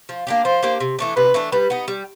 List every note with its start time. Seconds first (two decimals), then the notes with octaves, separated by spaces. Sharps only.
0.09 F3
0.27 A#3 D4 G4
0.45 F3 C5
0.63 A#3 D4 G4
0.80 C3
0.99 E3 A3 D4
1.17 C3 B4
1.34 E3 A3 D4
1.52 G3 B4
1.70 B3 D#4
1.88 G3